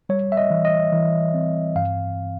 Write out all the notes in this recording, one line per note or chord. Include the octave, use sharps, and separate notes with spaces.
G3 C#5
E5
D#5
E3
D#5
E3
C4
G2 F5